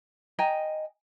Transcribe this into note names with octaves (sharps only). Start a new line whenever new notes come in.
D#5 G5 G#5 A#5